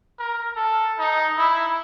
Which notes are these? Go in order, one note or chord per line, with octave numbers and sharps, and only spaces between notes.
A#4
A4
D#4
E4